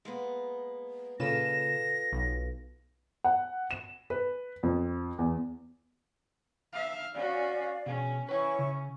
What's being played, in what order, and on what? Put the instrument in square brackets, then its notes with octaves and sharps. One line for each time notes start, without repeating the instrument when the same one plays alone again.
[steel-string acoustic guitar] G#3 A#3 B3
[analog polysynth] A#2 C#3 E7 [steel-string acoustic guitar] F4 A4 B4 [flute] A#6
[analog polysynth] B1
[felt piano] F#5
E7
B4
F2
E2
[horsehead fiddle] E5 F5
[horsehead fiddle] C#4 F#4 [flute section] D5 F5
[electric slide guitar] B2 G#4 [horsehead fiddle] C#4
[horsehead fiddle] C#4 [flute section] E4 C#5 C#6 [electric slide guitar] B4 G5 G#5
[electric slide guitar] C#3